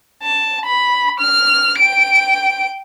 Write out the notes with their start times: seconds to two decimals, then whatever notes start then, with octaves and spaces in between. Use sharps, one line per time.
0.23 A5
0.66 B5
1.20 F6
1.79 G5 D7